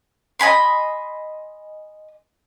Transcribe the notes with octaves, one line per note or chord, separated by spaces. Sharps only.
D#5 G#5 B5 C6